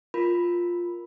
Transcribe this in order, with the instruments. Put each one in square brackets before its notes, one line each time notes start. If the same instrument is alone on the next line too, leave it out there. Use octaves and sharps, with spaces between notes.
[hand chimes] F4 A#4 B5